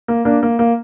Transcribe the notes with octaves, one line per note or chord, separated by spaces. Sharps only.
A#3
A#3 D4
A#3
A#3